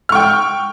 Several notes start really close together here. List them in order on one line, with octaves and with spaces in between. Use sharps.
F6 C#6 G5